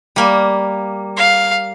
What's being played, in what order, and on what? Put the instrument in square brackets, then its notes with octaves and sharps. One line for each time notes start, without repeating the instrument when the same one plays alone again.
[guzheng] G3 A#3
[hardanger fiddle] F5